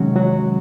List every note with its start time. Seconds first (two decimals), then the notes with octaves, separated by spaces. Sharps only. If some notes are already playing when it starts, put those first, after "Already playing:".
Already playing: C3 D#3 F#3 G#3 C#4 F#4
0.16 F#3 F#4